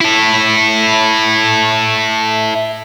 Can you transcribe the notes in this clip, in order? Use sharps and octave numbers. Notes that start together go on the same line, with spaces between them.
E4 A4